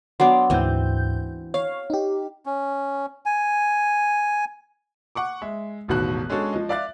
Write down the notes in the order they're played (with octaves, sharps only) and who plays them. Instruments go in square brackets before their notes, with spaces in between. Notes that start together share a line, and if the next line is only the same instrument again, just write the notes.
[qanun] F#3 B3 D4 [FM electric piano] C6 D6
[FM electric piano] D2 G#2 G6 [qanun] E3 C4
[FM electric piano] C#5 [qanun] F5
[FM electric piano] D#4 G4
[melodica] C#4
G#5
[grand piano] F#5 C#6 D6
G#3 E5
E1 A1 B2 D#3 F#4 F#6
G#3 C#4 D4 F#4 A4
F3 D#5
D5 E5 F5 D6 F#6 A6